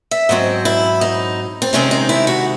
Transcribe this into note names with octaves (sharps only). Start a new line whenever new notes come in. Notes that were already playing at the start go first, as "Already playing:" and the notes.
E5
G#2 F#3 C4 D#5
E4
D#4
C4
C3 D#3 G#3 C4 C#4
D#4
E4
F#4